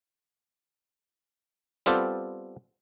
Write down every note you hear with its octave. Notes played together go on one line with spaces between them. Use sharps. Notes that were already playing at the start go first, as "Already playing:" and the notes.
G3 B3 C4 F4 G4 A4